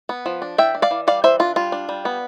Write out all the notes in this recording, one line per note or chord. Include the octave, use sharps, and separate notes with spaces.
B3
F3
D4
E3 E5 G5
D4
D5 F5
E3
G3 D5 F5
E3 C5 E5
D4 F4
G3 F4
D4
G3
B3